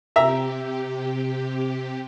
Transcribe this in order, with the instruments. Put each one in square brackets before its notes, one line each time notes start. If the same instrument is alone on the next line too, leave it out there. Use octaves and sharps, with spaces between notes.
[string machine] C3 G4 [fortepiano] E5 A#5